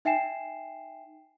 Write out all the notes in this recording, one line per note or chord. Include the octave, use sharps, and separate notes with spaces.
D#4 E5 G5 G#5 C7 E7